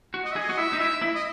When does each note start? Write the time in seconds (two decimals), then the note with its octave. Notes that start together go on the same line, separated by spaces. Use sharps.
0.14 F#4
0.25 D#5
0.32 E5
0.36 G#4
0.38 D#5
0.50 F#4
0.57 E4 E5
0.73 D#4
0.80 E4 E5
1.02 E4
1.15 D#5